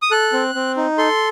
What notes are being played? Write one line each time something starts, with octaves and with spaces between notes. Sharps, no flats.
D#6
A4 F#6
C4
C4
D#4
A4 C6